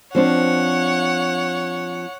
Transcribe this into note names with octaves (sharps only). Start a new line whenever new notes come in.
F3 C4 D4 C#5 F#5